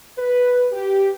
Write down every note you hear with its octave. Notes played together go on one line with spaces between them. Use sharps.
B4
G4